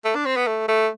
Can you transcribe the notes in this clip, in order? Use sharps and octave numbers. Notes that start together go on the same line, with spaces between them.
A3
D4
C4
B3
A3
A3